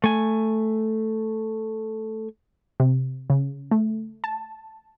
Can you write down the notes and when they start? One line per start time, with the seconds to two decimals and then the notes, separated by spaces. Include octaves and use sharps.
0.04 A3 G#5
2.80 C3
3.30 C#3
3.71 A3
4.24 A5